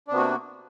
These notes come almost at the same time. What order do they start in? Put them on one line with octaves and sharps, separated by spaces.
D4 C3 B3 F#4 A#3